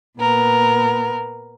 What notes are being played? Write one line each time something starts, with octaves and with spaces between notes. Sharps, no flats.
A#2 B3 A#4